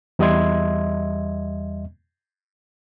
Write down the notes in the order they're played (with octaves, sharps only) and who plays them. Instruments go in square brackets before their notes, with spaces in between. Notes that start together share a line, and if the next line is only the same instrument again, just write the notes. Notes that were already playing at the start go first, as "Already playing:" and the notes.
[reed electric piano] E2 G3 D#5 E5 C6 G#6